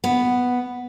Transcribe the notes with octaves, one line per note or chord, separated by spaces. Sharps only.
B3